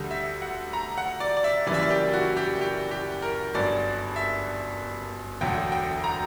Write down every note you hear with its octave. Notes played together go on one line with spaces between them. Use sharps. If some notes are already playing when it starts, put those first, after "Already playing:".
Already playing: D2 D3 G3
E5
F#5
A#5
F#5
D5
D5
E5
F#1 F#2 E3 G3 D5
E5
D5
G4
F#4
G4
G4
G4
A#4
G1 G2 F#3 D5
E5
E1 D2 D3 F#3 G5
G5
A#5